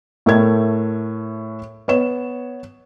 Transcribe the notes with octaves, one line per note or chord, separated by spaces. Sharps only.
A2 A3 A#4 G#6
B3 C#5 E7